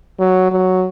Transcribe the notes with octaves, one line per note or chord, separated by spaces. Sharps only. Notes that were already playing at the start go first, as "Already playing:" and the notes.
F#3
F#3